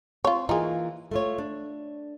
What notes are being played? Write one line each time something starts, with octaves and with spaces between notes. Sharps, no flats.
C4 F4 C#5
E3 A#3 D#4 F4 G#4
A3 F4 C#5
D4